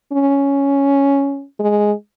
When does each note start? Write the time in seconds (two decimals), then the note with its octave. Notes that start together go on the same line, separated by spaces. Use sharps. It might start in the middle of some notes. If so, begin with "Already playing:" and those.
0.13 C#4
1.59 G#3